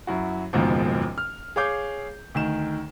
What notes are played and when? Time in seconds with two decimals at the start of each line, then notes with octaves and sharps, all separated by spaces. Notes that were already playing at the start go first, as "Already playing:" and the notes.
0.07 F#2 E4 F#4
0.53 F#1 D#2 G#2 B2 F3
1.18 F6
1.56 G#4 C#5 F5 D6 G6
2.35 D2 D#3 E7